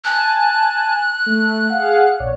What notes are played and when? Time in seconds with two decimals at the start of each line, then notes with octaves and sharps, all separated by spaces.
0.05 G#5 A5 F#6
1.26 A3
1.70 G#4 F5 F#5
2.20 A#1 C#5 D5